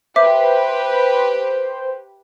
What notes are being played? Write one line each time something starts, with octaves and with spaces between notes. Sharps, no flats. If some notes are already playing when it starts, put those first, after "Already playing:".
G4 B4 C5 E5 D6